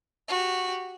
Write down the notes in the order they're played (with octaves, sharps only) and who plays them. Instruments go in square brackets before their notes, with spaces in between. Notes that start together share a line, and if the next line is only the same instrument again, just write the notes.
[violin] F#4 G4